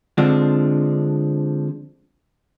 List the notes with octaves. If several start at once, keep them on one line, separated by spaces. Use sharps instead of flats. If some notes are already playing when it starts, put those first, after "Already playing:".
D3 F3 G#3 C4 D4